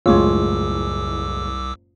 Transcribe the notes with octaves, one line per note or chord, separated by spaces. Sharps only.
F#1 C2 A2 G#3 F4 C#5 D6 E6